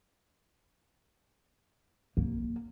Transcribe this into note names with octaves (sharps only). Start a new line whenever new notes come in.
A#3